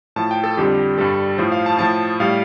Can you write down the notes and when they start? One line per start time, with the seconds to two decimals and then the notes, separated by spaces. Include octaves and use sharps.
0.16 A2 F3 A5
0.31 G5
0.44 A4
0.57 F2 D3 G3 G4
0.98 G2 G3 A4
1.38 A2 F3 C5
1.52 F5
1.66 A5
1.79 A2 F3 A5
2.20 A2 G3 F5